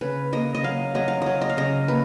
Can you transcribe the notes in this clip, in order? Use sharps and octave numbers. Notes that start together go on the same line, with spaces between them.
C#3 B4
A#3 D#5
D#5
F#3 F5
F#3 D#5
F5
F#3 D#5
D#5
F5
C#3 D#5
A#3 B4